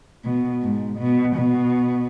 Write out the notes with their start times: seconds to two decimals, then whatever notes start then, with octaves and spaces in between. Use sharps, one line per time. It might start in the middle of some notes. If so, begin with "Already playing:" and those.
0.24 B2
0.62 G#2
0.99 B2
1.36 B2